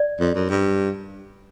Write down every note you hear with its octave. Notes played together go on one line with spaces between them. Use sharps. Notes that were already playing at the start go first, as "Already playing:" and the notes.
Already playing: D5
F2
F#2
G2